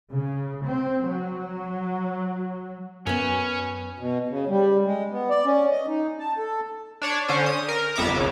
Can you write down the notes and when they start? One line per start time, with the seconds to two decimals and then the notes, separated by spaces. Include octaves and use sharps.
0.11 C#3
0.66 C4
1.07 F#3
3.07 F#2 B3 C#4 C#5 G#5
3.99 B2
4.29 C#3
4.49 G3
4.85 G#3
5.11 B3
5.30 D5
5.45 C#4
5.71 D#5
5.87 D#4
6.19 A5
6.38 A4
7.02 D4 C#5 D5
7.28 D3 C#4 C5
7.46 D#6
7.68 A#4
7.96 G1 F2 B3 E5 A#5 D6
8.16 C#2 C#3